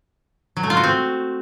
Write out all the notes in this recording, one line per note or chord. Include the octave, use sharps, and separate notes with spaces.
F#3
A3
F4
F#4
C4